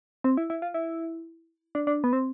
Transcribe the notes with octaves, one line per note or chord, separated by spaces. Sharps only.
C4
E4
E4
F4
E4
D4
D4
B3
C4